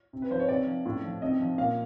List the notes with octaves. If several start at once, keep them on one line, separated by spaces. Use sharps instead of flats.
C3
B4
F3 C5
C#5
C3 D5
F3
A2
F3
C3 D#5
F3
A#2 F5